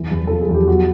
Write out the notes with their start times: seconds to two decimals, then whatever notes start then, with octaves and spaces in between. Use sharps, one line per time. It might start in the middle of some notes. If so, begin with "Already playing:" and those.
Already playing: E2 E3
0.11 E2
0.27 F3 A4
0.41 G#4
0.49 E2
0.54 G4
0.68 F#3 F#4